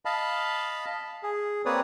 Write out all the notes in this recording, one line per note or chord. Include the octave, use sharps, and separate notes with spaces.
D#5 F5 A5 B5
G#4
A#3 C4 B4 C#5 D5 D#6